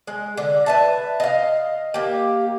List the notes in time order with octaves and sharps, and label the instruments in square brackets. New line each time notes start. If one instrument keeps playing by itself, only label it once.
[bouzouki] G#3
D3
B4 E5 A5
D#5 F5
A#3 G4